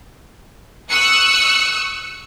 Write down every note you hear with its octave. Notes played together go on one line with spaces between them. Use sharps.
C#6 D#6 E6 F#6 C#7